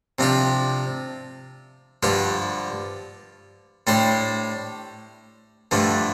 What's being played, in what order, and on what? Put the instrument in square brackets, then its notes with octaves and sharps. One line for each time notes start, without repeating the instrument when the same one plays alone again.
[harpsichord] C3 F3 D4 G4
G2 D3 F3 D4 G4
A2 G3 D4 G4 C5
G2 D3 F3 A3 D4